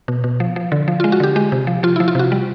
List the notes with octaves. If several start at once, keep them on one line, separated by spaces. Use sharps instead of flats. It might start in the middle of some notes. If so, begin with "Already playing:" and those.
B2
B2
F3
F3
D3
F3
G#3 F4
F#4
D3 G4
G#3 G4
C3
F3
F3 F4
F3 E4
F4
C3 F#4
G3